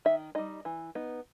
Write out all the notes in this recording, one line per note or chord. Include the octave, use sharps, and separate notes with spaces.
D#3 E5
G3 D#4 D#5
E3
B3 D#4